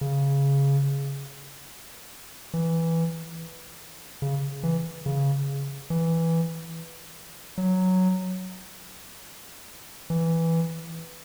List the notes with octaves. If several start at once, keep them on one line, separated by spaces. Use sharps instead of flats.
C#3
E3
C#3
E3
C#3
E3
F#3
E3